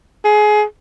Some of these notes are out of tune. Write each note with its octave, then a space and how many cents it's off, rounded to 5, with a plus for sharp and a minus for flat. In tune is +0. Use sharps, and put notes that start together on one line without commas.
G#4 +20